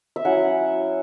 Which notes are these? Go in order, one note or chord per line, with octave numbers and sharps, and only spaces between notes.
E5
F#3 C#4 E4 F#5